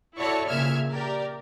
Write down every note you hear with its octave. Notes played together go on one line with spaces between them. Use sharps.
E4 F#4 A4 C#5 D5 C#6
A#1 A#2 C#3 E5 F6 G#6
G4 A#4 D5